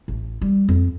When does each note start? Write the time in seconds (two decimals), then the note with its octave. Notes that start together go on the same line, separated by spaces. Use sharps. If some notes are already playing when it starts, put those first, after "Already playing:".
0.08 A1
0.41 G3
0.68 F2